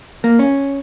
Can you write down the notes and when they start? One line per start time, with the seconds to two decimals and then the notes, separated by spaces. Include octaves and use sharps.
0.24 A#3
0.39 C#4